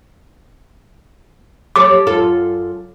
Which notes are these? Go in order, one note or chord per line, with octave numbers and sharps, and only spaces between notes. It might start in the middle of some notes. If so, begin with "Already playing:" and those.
G4 A4 C#5 D6
F#2 F4 A4